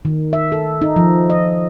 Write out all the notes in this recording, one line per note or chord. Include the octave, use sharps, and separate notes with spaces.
D#3
E5
A4
D#4
F3
D#5